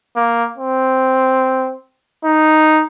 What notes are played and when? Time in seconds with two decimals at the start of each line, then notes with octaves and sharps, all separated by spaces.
0.16 A#3
0.57 C4
2.25 D#4